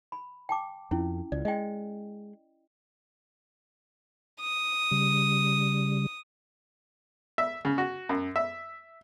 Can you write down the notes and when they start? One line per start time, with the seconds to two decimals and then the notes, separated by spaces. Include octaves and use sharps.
0.12 B5
0.49 G5 A5 D6
0.91 F2 C#4 E4
1.32 C#2 D5
1.45 G#3 D#5 G5
4.40 D#6
4.91 C#3 G3
7.38 E5
7.65 C#3
7.78 F#4
8.09 F#2
8.36 E5